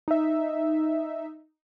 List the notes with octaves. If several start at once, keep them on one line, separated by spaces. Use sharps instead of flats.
D#4 E5